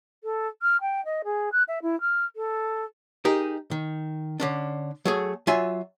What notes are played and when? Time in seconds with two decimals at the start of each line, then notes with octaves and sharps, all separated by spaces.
0.23 A4
0.61 F6
0.81 G5
1.04 D#5
1.24 G#4
1.52 F#6
1.67 E5
1.82 E4
2.00 F6
2.36 A4
3.25 D#4 G4 G#4 A#4
3.71 D#3
4.40 D3 C#4 D4
5.05 F#3 A3 G#4
5.47 F#3 F4 E5 G#5